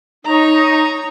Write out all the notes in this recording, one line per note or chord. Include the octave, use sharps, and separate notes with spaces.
D#4 C#5 A#5